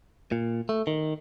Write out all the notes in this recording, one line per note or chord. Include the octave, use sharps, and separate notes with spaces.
A#2
A3
D#3